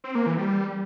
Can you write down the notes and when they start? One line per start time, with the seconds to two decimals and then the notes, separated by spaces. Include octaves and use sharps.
0.04 C4
0.15 A#3
0.26 E3
0.38 G3